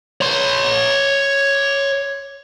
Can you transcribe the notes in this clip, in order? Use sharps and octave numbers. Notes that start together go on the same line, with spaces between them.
C#5 C6